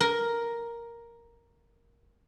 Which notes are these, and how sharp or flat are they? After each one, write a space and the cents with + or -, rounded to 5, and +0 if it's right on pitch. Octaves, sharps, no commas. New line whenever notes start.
A#4 +5